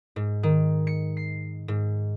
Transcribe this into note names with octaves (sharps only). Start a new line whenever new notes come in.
G#2
D#3
C#7
C7
G#2